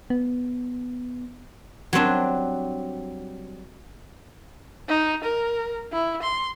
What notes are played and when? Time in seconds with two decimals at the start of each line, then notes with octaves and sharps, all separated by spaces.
0.10 B3
1.93 F#3 G3 C4 D4
4.88 D#4
5.24 A#4
5.92 E4
6.22 C6